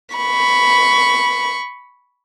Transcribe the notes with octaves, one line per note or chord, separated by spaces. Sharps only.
B5 C#6